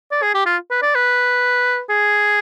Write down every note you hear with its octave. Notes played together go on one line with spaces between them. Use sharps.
D5
G#4
G4
F4
B4
D5
B4
G#4